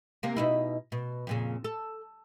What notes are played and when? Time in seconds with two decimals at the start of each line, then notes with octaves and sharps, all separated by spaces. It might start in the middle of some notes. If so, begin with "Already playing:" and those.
0.23 C3 A#3
0.36 B2 D#4 E4
0.92 B2
1.27 F2 A#2 C#3
1.64 A4